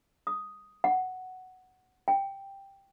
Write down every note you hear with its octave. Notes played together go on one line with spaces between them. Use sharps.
D#6
F#5
G5